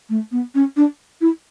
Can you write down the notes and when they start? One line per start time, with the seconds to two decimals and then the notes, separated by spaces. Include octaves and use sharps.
0.10 A3
0.32 B3
0.55 C#4
0.77 D4
1.21 E4